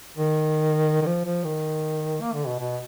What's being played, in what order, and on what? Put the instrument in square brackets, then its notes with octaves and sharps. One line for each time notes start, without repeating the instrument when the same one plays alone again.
[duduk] D#3
D#3
F3
F3
D#3
A#3
D3
B2
B2